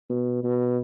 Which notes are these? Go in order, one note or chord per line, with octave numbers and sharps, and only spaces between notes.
B2
B2